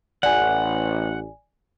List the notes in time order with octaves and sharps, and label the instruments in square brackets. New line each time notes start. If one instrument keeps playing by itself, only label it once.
[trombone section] A1 [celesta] D5 G#5 [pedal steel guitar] F#5